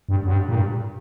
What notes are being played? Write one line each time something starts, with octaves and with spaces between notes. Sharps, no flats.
G2
F#2
G2
A#2
G2